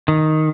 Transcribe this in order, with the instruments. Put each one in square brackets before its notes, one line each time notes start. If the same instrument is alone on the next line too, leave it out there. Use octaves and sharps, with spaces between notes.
[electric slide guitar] D#3